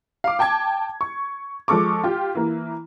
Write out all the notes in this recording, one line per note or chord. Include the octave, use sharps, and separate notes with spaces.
F5 D6
G5 A5 D6 G#6
C#6
F3 G#3 A4 C#6 D6
F4 G4
E3 A#3